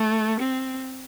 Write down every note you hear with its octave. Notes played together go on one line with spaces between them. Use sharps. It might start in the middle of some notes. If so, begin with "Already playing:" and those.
Already playing: A3
C4